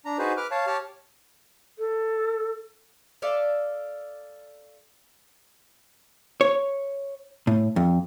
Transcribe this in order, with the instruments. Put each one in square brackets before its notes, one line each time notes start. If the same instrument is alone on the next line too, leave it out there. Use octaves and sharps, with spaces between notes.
[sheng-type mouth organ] D4 A#5
D#4 F#4 G#4 B4 C5
B4 D6 F6
C#5 F5 A5
G4 C#5 A5 F6
[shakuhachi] A4
[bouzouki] A4 D5 E5 F5
[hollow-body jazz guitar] C#5
A2
F2